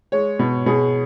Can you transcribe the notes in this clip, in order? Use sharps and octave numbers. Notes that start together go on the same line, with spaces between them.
G#3 C#5
B2
B2 G#4